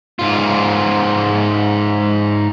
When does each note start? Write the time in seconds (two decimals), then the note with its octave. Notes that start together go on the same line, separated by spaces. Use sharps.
0.19 G#2 F4